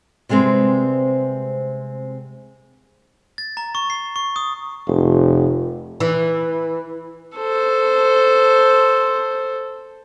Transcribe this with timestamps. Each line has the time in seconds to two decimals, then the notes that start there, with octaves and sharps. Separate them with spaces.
0.29 C3 G3 G#3 B3 C4
3.38 A6
3.57 A#5
3.75 C#6
3.90 C7
4.16 C#6
4.36 D#6
4.87 F1
6.00 E3
7.37 A4 C5